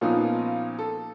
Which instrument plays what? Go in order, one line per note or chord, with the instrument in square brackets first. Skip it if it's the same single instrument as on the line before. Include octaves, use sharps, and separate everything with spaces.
[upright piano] A#2 F3 B3 C#4 D#4 F4
A4